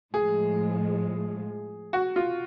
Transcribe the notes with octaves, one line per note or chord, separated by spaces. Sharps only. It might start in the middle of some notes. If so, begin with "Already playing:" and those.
A2 F3 G#3 G#4
F#4
F4